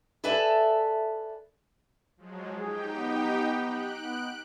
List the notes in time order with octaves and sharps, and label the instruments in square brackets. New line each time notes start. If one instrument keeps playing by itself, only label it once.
[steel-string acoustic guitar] A4 B4 D5 E5 G#5 A5
[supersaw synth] F3 F#3 G#3
[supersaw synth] D#4 G4 G5 [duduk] G#4
[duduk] B3
[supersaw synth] F#6 D7
[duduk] B3